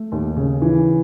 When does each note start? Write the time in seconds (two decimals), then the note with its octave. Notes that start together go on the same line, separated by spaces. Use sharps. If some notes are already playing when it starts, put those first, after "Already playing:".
Already playing: A3
0.12 D#2
0.36 C#3
0.62 E3